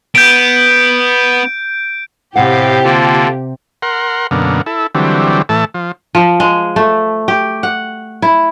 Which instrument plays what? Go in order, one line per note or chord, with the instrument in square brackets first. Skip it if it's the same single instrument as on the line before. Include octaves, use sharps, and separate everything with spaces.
[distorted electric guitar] B3 [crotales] G6 D7
[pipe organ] A2 F5 [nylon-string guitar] C3 C5 F#5 [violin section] G4
[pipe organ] D3 A#3 [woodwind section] F4 A5
[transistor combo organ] A#4 F#5 C6
F#2 B2 D3 A#3
E4 A4
D3 E3 F#3 G3 C4
A2 E3 A3 A5
F3
[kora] F3
G#3
A3
G4
F#5
E4